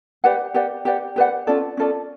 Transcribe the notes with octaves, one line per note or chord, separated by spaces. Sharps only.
G4 B4 D5 F#5
G4 B4 D5 F#5
G4 B4 D5 F#5
G4 B4 D5 F#5
C#4 F4 A4 D5
C#4 F4 A4 D5